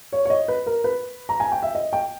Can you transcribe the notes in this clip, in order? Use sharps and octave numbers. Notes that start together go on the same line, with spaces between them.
C#5
C#5
D#5
B4
A#4
B4
A#5
G#5
G5
E5
D#5
G5